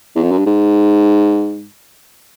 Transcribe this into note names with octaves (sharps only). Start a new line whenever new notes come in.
E2
F2
F#2
G2
G#2